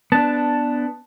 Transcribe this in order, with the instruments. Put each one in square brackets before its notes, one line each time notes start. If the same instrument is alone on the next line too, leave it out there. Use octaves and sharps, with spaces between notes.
[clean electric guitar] B3 D4 [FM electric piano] A5